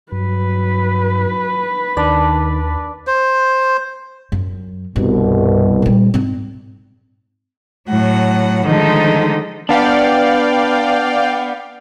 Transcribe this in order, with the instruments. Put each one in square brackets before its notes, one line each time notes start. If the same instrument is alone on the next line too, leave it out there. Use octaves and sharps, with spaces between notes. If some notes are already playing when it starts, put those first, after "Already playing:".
[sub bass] G2 [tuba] F#3 [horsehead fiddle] B4
[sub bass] D#2 [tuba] D#3 [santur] D4 D5
[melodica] C5
[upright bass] F#2
[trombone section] C2 B2 [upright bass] G2
[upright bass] A#2 G3
G#2 C4
[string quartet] A2 F#3 F#5
D3 D#3 F3 G#3 A3 D#4
[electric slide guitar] B3 D4 [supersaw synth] D5 F5 G5